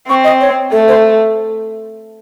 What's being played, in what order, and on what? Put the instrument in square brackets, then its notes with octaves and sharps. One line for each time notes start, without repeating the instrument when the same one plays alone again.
[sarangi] C4 [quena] C#6
[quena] D#5
C#5
[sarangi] A3 [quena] A4
[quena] C5